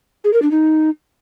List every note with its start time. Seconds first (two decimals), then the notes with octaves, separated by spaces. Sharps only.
0.24 G#4
0.33 A#4
0.42 D4
0.51 D#4